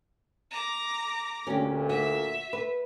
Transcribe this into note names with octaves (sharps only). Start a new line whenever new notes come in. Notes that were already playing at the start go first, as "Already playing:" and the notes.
A#5 D6
D2 A#2 C#4 G4
F#4 E5
B4